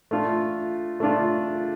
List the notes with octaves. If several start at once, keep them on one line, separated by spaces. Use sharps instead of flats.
A3 D4 F4
A3 D4 F4